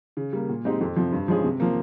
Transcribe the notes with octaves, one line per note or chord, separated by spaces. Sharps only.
C#3
G3 A#3
A#2
G#3 C4 D#4 G4
F2
C3 F3
G2
F3 G#3 C#4 G#4
C3
F3 A#3